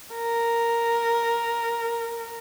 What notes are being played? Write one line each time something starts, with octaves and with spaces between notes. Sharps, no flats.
A#4